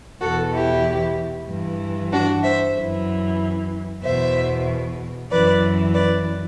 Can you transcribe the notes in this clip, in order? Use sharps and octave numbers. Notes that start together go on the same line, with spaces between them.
E2 B2 F#4 A4
E4 G4
G2 E3
D4 F#4
C5 E5
F#2 E3
E2 B2 C5 E5
F#2 E3 B4 D5
B4 D5